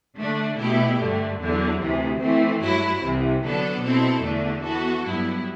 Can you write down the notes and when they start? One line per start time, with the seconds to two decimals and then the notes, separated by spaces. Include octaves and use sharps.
0.17 D3 A3 D4
0.59 B2 A3 E4 G4
0.98 G2 D3 A3
1.40 E2 D3 F#3
1.79 D2 C3 E3
2.20 E3 A3 C4
2.61 G2 F#3 A3 E4
3.01 C2 C3 E3
3.41 D3 F#3 B3 D4 A4
3.82 B2 F#3 C4 E4 A4
4.22 E2 D3 A3 D4
4.62 E3 B3 F#4 A4
5.04 G2 F#3 B3 E4